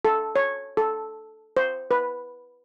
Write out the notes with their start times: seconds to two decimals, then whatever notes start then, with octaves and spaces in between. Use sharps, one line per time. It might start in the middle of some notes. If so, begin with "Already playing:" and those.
0.05 A4
0.36 C#5
0.77 A4
1.57 C5
1.91 B4